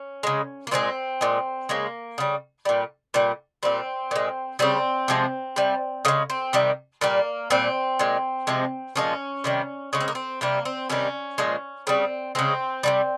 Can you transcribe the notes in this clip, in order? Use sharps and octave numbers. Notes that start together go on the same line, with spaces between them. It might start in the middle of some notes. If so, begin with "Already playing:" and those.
Already playing: C#4
C#3 G#3
A#3
A#2 F3 G#3 C4
A#2 G#3
C#3 G#3 A#3
C#3 G3
A#2 G3
A#2 G3
A#2 G3 C4
A#2 G#3
C#3 G3 C4
C3 F3 G#3
C3 G3
C#3 G#3 A#3
C4
C3 D#3 G3
A#2 G3 A#3
A#2 G3 C4
A#2 G#3
C3 F3 G#3
A#2 F3 G#3 C#4
C3 D#3 G3
C#3 G#3 C#4
C4
A#3
C4
C3 G3 A#3
C4
C3 D#3 G3 C#4
A#2 F3 G#3
C#3 G3 C4
C#3 G#3 C4
C3 D#3 G3